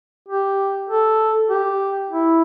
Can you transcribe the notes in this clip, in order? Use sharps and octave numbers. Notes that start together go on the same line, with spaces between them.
G4
A4
G4
E4